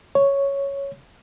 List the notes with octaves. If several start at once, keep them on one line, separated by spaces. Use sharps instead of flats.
C#5